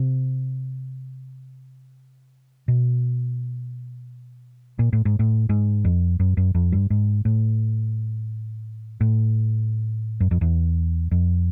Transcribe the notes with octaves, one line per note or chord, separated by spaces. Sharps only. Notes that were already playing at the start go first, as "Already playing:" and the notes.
Already playing: C3
B2
A#2
A2
G#2
A2
G#2
F2
F#2
F#2
F2
G2
G#2
A2
A2
F#2
F2
E2
F2